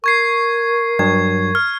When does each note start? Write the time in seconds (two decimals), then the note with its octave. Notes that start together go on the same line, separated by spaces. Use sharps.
0.04 A#4 C#6 G#6 C7
0.99 G2 F#3 G#6
1.55 F6